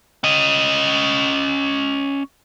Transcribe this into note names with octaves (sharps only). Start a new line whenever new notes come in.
C#4 D#5